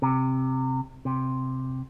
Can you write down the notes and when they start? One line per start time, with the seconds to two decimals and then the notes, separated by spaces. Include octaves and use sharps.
0.02 C3
1.05 C3